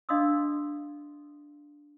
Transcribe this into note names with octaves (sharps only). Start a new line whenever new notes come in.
D4 D#5 F5 C6 D#6 E6